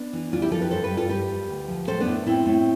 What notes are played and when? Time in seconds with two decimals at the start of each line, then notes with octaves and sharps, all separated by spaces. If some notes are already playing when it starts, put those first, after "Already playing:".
Already playing: B3 D4
0.13 E3
0.32 D2 D4 F4
0.42 E4 G4
0.51 F3 F4 A4
0.62 G4 B4
0.71 G2 A4 C5
0.84 G4 B4
0.90 G2
0.97 F4 A4
1.09 G2 G4 B4
1.29 G2
1.49 D2
1.68 F3
1.87 A2 A4 C5
2.00 B3 D4
2.06 A2
2.26 A2 C4 E4
2.46 A2